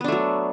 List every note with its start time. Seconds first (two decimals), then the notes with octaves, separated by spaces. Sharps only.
0.01 B3
0.04 D4
0.08 A3
0.12 F#3